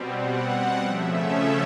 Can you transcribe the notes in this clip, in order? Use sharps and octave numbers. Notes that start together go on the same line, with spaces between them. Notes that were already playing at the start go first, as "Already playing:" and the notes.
Already playing: B2 G3 C4
F#5
C#3 F3 A3 C#4 E5